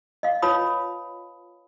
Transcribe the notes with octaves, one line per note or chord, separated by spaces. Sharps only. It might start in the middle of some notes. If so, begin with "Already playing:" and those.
D#5 F5
F4 B4 C#5 A5 B5 D#6